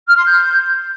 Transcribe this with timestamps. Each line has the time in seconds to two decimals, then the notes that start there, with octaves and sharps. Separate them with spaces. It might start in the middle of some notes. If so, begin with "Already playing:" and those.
0.08 F6
0.16 C6
0.25 G6